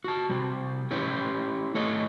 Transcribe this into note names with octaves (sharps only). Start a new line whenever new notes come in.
F#4 A5
C3 G3
C#4 E4 G4 C#5
A3 A4 C#5 D#5